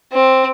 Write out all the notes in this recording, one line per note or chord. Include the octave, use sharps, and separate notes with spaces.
C4